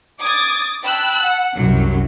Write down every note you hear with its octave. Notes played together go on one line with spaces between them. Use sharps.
D6 D#6 G#6 A6
G5 A5 B5 E6 F#6
F#5
C2 F#2 F#3